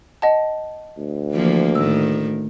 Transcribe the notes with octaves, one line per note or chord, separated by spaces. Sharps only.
D#5 F#5 A5
D2
E3 F3 A#3
A2 D#3 E6